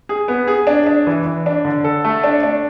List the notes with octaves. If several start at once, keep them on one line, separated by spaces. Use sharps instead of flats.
G#4
B3
G#4
D4
D4
E3
E3
D4
D3
A4
A3
D4
D4